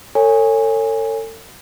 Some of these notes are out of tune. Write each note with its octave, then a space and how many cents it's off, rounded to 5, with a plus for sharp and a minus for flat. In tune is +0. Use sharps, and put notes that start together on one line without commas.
A4 +40 C#5 +0 G#5 -15